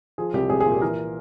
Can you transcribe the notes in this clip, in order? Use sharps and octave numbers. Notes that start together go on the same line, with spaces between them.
F3 G#4
C2 G4
C2 G#4
G#4
A#2
G4
E3 A#4